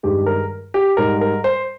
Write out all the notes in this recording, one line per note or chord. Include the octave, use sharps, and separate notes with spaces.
G2 D#3 G#3 G4
A#4
G4
G#2 G3 A#4
A#4
C5